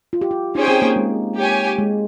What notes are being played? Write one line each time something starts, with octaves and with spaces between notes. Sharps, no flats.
F4
G4
F4
C#4 D#4 G#4 C5 G5
C4
A#3
G#3
G4 C#5 G#5
G#3